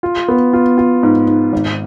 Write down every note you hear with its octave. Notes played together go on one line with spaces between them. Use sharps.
F4
B3
F4
F4
G#2
G#2
G#1